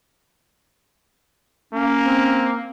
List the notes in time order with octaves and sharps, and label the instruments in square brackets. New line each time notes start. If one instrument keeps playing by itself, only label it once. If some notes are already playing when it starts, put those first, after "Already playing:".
[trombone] A#3 [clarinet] C#4
[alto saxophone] C4